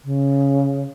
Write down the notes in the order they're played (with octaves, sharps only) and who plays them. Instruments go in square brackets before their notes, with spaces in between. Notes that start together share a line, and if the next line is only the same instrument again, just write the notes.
[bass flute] C#3